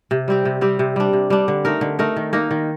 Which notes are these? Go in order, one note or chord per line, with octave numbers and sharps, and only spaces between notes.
C3
G3 C4 G4
C3
G3 C4 G4
C3
G3 D4
C3
G3 D4
D3
A3 D#4 A#4
D3
A3 D#4 A#4
D#3
A#3 D#4 A#4
D#3